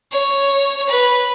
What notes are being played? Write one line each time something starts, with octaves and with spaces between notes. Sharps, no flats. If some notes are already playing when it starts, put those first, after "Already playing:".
C#5
B4